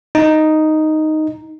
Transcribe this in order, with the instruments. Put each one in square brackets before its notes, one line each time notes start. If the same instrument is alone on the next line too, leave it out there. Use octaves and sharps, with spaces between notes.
[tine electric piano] D#4